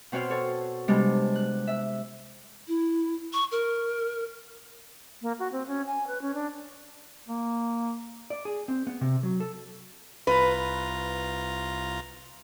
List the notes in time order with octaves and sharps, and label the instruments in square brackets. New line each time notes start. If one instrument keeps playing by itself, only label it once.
[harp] B2 C4 F#4 C#5 C6 F6
A4 C#5
C3 G3 G#3 B3 D4
F#6
E5
[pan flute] E4
C#6
A#4
[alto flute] A#3
F#4
C4
C#4
G#5
B4
C#4
D4
[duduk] A#3
[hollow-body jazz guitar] D5
G#4
C4
B3
C3
F#3
A4
[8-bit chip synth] C2 F4 A#5 [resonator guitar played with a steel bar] B4